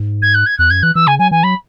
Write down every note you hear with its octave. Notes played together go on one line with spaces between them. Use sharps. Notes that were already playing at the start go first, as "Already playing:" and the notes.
Already playing: G#2
G#6
F#6
G#6
E2 F#6
F#2 G#6
E3 F#6
E3 E6
C#3 G#5
F#3 G#5
E3 G#5
F#3 B5